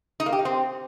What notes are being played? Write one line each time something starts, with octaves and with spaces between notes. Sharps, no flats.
D#4
A#3
G4
D#4
C4